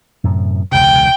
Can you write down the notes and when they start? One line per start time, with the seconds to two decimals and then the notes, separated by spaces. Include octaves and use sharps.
0.24 F#2 A2 C3
0.72 E1 C#2 C3 G5